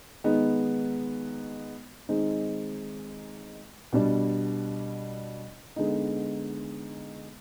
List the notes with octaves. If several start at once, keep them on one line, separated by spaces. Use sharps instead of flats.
D#3 G#3 B3 D#4
D#3 G#3 C4 D#4
B2 G3 D4
D3 G#3 B3 D#4